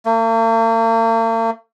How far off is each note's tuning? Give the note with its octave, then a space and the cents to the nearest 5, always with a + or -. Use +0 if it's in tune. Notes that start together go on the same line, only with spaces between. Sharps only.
A#3 -45